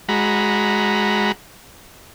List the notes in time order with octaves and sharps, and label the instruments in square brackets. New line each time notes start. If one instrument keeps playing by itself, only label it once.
[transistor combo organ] G#3 F#4 A#5 B5